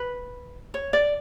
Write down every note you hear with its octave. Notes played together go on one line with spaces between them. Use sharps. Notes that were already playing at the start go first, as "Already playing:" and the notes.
Already playing: B4
C#5
D5